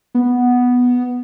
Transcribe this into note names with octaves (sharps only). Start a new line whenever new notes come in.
B3